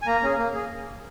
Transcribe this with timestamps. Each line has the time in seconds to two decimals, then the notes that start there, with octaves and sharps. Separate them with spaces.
0.02 G#5
0.07 A#3 A#5
0.23 C#4 G#4
0.38 A#3
0.55 G#4